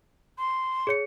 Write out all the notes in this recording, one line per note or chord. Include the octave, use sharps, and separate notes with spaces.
C6
G#4 C#5 C#7